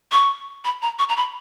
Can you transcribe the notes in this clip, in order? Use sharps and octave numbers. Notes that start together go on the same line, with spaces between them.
C#6
B5
A#5
C#6
A#5
B5